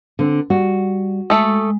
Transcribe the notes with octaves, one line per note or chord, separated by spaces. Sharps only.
D3 C4
G3 F#4
G#3 A3 A4 D#6